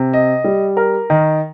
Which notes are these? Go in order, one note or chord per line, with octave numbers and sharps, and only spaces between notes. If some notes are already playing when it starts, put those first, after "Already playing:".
Already playing: C3
D#5
G3
A#4
D#3